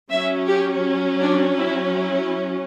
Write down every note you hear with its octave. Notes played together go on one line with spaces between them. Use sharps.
F#3 C#4 E5
G4
D4
E4
E4